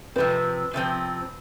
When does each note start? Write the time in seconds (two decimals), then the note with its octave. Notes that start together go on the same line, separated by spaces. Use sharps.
0.16 C3 F3 C4 B4
0.74 C3 F3 C4